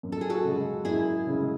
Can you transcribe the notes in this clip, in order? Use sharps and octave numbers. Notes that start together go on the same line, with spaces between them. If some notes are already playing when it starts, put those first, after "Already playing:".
F#2
A4
G#4
F#4 A4
C#3 G#3
F#2 E4 G#4
C#3 G#3